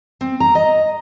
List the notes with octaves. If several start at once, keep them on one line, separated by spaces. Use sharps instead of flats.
C4
A#5
D#5